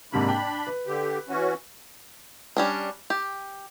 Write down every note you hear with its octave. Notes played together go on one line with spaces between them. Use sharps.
G#2 C3 A#3 D4 B5
G5
B4
D3 G4
E3 C#4 F#4
G3 C#4 D4
G4